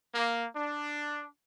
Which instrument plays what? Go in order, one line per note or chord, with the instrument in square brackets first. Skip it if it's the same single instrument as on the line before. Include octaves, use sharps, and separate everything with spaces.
[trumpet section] A#3
D4